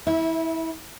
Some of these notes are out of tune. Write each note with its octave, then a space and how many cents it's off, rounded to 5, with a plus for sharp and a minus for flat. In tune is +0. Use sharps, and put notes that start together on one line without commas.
E4 -25 E5 +0